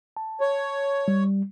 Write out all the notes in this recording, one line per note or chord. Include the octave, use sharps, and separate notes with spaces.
A5
C#5
G3